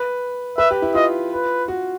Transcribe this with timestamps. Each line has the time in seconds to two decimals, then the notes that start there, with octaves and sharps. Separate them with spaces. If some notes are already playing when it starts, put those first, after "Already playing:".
Already playing: B4
0.58 B4 E5
0.71 G4
0.82 E4
0.95 F4 D#5
1.32 B4
1.68 F#4